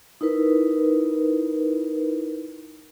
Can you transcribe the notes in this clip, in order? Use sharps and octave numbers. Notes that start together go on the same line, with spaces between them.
D#4 E4 A#4 B4